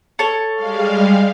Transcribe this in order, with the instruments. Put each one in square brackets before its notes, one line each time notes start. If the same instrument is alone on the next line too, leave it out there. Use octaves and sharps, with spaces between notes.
[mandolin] A4 C#5
[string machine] G3 G#3 F5